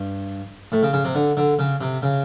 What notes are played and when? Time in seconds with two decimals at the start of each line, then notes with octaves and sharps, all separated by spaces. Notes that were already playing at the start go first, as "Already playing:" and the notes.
Already playing: G2
0.72 A2
0.83 C#3
0.93 C#3
1.05 C3
1.15 D3
1.37 D3
1.59 C#3
1.81 C3
2.03 C#3